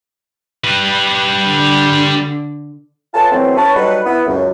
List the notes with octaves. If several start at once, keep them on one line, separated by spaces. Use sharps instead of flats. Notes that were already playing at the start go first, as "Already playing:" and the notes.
G3 B4
D3
F4 A4 B4 C#5 G#5 A5
E3 F#3 A3 B3 C4
C#4 B4 C#5 A5
F#3 G3 D#4 A4 B4
B3 E4 B4
C#2 F#2